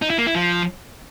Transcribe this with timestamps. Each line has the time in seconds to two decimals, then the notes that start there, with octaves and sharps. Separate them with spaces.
0.02 D#4
0.10 E4
0.18 A#3
0.27 E4
0.35 F3